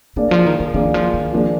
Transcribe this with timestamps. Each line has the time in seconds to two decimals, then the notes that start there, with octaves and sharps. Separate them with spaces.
0.16 D3 A#3 D4 G#4 D5
0.31 F3
0.46 D#3
0.60 D#3
0.74 D#3 A#3 D4 G#4 D5
0.94 F3
1.14 D#3
1.32 F3 A#3 D4 G#4